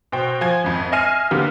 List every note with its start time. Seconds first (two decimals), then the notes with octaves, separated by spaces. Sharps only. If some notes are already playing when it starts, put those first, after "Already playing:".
0.12 B2 C5 G5
0.41 F3 G#5 G#6
0.64 G#1 F2
0.92 D#5 E5 G#5 F6 C7 D#7
1.31 D3 A#3 B3 G4